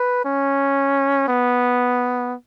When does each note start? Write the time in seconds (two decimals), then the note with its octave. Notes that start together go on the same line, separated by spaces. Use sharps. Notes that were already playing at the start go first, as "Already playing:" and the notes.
Already playing: B4
0.25 C#4
1.28 B3